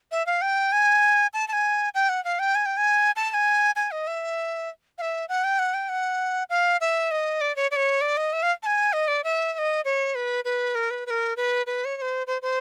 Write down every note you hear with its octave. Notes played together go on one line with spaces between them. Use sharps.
E5
F5
G5
G#5
A5
A5
G#5
G5
F#5
F5
G5
G#5
G5
G#5
A5
A5
G#5
G#5
D#5
E5
F5
E5
F#5
G5
F#5
G5
F#5
F5
E5
D#5
D5
C#5
D5
C#5
D5
D#5
E5
F5
A5
G#5
D#5
D5
E5
E5
D#5
C#5
B4
B4
A#4
B4
B4
A#4
B4
B4
C#5
C#5
C5
C5
C5